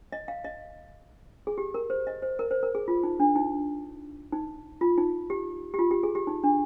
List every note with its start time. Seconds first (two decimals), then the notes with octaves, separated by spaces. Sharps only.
0.12 D#5
0.28 F5
0.44 D#5
1.47 G#4
1.58 G4
1.74 A#4
1.90 C5
2.07 D#5
2.22 C5
2.39 A#4
2.51 C5
2.63 A#4
2.75 G#4
2.88 F4
3.03 D#4
3.20 D4
3.36 D#4
4.32 D#4
4.81 F4
4.98 D#4
5.30 G4
5.74 G4
5.79 F4
5.91 G4
6.03 G#4
6.15 G4
6.27 D#4
6.43 D4